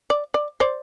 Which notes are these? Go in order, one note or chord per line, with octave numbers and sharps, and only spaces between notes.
D5
D5
C5 D5